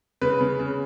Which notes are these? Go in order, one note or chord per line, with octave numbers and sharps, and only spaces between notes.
C#3 B4
C#3
C#3